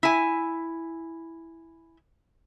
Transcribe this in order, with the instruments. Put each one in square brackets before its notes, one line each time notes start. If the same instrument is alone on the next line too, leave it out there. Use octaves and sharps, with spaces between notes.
[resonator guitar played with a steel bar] E4 G#5